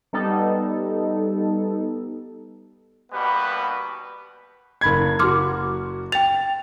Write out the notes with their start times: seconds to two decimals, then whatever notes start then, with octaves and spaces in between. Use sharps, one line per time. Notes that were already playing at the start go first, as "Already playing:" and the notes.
0.13 G3 B3 D#4 A4
3.13 D#2 B2 G3 B3 F#4 B4
4.81 F#1 B5 G#6
5.19 F#1 F#4 C6 D6 F6
6.12 G5 A6 F7